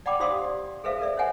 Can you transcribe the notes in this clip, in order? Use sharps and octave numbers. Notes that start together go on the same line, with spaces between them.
D5 F#5 G5 B5 D6
G4 C5 D5 F5 C6 D#6
G4 D5
G#4 A4 B4 C5 E5 F5
A#4 B4 D5 E5
C5 C#5 E5 F#5 G#5